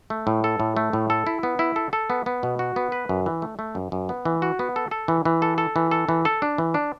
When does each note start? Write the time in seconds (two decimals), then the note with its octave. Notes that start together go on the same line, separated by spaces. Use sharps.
0.10 A3
0.27 A2
0.44 A4
0.60 A2
0.77 A3
0.93 A2
1.10 A4
1.27 E4
1.43 B3
1.59 E4
1.76 A4
1.93 A4
2.10 B3
2.26 B3
2.43 B2
2.59 F#4
2.76 B3
2.92 B4
3.09 F#2
3.26 E3
3.42 A3
3.59 A3
3.75 F#2
3.92 F#2
4.09 B3
4.25 E3
4.42 F#4
4.59 B3
4.76 A4
4.91 A4
5.08 E3
5.25 E3
5.42 A4
5.58 A4
5.76 E3
5.91 A4
6.09 E3
6.25 A4
6.42 D4
6.58 E3
6.74 D4